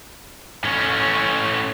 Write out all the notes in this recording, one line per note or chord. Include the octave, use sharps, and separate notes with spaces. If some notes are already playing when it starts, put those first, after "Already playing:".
A2 C#4